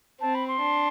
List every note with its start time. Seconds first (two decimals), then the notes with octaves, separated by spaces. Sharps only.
0.20 C4 A5
0.34 B5
0.47 C6
0.60 D4